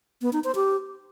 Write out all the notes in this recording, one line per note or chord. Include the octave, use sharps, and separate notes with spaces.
B3
D#4
C5
G4